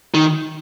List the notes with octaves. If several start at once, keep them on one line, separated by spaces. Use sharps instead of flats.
D#3